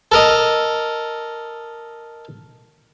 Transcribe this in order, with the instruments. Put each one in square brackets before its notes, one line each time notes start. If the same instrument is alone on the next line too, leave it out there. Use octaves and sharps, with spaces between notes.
[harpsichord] A4 A#4 D#5